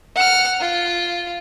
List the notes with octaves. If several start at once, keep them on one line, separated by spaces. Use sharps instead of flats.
F#5 F6
F4